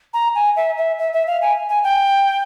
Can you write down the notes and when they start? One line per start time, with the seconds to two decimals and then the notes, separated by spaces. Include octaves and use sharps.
0.14 A#5
0.35 G#5
0.56 E5
0.78 E5
0.99 E5
1.13 E5
1.27 F5
1.42 G#5
1.69 G#5
1.84 G5